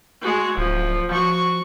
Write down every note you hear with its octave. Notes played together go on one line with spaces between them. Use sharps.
G#3 F#4
D1 F3
F3 F#4 C#6